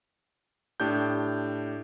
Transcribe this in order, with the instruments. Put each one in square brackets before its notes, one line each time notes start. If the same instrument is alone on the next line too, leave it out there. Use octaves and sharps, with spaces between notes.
[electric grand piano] A2 D4 G4 G6